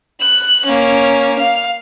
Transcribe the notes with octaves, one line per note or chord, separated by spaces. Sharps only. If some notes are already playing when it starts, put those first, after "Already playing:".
F#6
A#3 C#4
F5